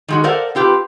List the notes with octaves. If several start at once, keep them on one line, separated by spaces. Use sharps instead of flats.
D#3 G#3 F#4
A4 A#4 C5 D5 F5 F#5
C4 F4 G4 B4